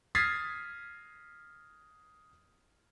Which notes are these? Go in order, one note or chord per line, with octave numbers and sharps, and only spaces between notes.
D#6 F6 G#6 A6 B6 C7